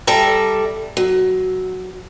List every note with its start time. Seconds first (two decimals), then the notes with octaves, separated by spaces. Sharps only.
0.07 G3 A4 E5 A#5
0.97 F#3